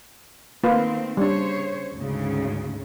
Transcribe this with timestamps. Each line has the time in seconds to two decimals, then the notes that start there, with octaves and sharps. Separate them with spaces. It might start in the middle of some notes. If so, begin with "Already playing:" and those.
0.64 D#3 A3 A#3 C4 F4 B4
1.17 C#3 G3 D4 C5 C#5
1.96 D2 G#2 C#3